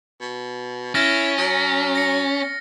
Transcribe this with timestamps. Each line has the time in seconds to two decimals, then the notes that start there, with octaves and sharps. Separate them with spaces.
0.21 B2
0.95 C#4 E4 F6 A6 A#6
1.38 F#3
1.95 A#6 C#7